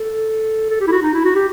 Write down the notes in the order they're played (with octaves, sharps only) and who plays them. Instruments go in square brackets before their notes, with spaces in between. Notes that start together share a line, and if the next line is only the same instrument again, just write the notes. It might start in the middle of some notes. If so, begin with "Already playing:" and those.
Already playing: [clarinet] A4
A4
G4
E4
F#4
D#4
E4
F#4
G4